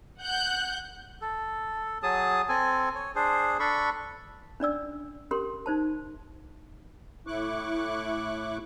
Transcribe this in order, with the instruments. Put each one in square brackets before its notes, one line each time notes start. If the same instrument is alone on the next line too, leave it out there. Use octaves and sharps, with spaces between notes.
[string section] F#5 F#6 G6
[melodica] A4
F#3 G#4 A5 D#6
C4 A4 G#5
C#5
D4 G#4 C5
D4 A4 B5 C#6
[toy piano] C#4 D4 D5 E6
C#4 G4 A#4 C6
D#4 C5 A5
[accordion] A2 E4 C#6 D6 F#6